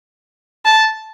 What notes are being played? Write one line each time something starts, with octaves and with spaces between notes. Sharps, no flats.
A5